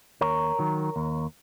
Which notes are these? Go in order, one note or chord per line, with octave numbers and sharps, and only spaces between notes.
D#2 A#4 C#5
D#3 F#3
D#2